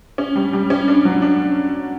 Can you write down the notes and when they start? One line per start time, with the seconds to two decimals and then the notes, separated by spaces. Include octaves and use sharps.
0.18 C#4
0.36 G3
0.53 G3
0.70 C#4
0.88 D4
1.05 F#3
1.22 D4